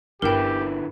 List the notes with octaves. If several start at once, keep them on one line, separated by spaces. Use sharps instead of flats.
G1 D3 E4 G4 A#4 B4 G5